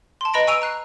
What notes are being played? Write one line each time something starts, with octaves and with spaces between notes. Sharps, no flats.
A5 C6
B4 D#5 A#5 B5 A#6 D7
G#5 C#6 E6 D7 D#7 F7
A#5 F#6 C7